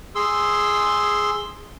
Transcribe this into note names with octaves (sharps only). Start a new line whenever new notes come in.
G#4 C6 E6